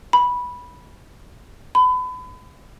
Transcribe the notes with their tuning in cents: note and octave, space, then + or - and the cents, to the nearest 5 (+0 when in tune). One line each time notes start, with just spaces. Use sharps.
B5 -10
B5 +30